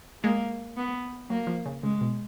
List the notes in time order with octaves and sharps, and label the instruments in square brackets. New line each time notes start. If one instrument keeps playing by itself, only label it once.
[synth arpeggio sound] G#3 [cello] A#3
[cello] B3
[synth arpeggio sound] F#3 [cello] A#3
[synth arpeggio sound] F3
C#3
[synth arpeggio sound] C#3 [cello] G#3
[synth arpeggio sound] B2